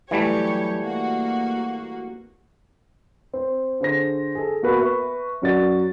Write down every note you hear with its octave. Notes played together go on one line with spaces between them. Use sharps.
E3 F#3 G3 A3 G4 C#5
A#3 F#4
C4
D3 G#4 C5 A#6
G#4 A4
A#3 B3 F#4 A#4 B4
B4 E5 C#6
F#2 C#4 F#4 D5 A6